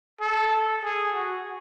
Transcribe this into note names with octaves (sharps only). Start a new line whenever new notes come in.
A4
G#4
F#4